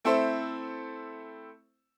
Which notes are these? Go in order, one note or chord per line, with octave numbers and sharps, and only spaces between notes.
A3 C4 E4 A4 C5